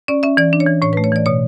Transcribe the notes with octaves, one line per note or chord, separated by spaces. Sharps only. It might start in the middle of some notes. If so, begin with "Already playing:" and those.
C#4 D5
C#4 E5
E3 D5
D4
C#5
E3
A2 C#5
B4
A3
C#5
E3 D5
B2 C#5